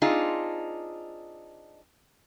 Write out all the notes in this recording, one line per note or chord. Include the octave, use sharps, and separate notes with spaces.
C4 D4 D#4 F4 G#4